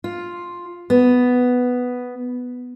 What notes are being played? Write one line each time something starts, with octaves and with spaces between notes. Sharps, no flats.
F4
B3